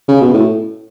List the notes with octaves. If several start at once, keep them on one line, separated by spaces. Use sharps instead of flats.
C#3
B2
A2